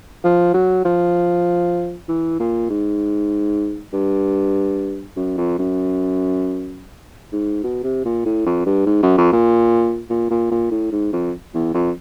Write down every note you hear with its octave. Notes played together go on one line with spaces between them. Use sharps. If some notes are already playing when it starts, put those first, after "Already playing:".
F3
F#3
F3
E3
A#2
G#2
G2
F#2
F2
F#2
G#2
B2
C3
A#2
A2
F2
G2
G#2
F#2
F2
A#2
A#2
A#2
A#2
A2
G#2
F2
E2
F2